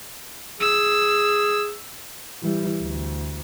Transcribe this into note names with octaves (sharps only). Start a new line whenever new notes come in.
G#4 E6
E3 G3
D2